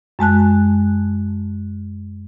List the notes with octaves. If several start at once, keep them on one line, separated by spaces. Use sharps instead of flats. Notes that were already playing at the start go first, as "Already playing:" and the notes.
F#2 G#3 A5 F#6